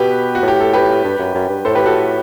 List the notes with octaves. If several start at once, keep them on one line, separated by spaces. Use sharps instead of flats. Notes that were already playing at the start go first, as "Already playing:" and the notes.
Already playing: B2 G4 B4
F#4
A2
G4
A4
G4 B4
G2
F#2
F#2
G2
A2 A4 C5
G4 B4
F#4 A4